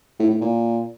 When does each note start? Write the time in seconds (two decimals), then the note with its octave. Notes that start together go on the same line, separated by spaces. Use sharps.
0.19 A2
0.30 A2
0.41 A#2